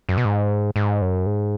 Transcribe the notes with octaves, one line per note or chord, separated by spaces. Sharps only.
F#2
B2
G#2
G#2
F#2
G#2